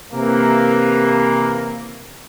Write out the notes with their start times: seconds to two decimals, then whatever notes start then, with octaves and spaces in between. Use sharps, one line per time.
0.13 C3 E3 A#3